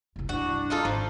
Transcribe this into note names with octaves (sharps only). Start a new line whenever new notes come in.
F#1 C2
G2 D4 E4 F#4
D#4 F4 A4
G#1 F3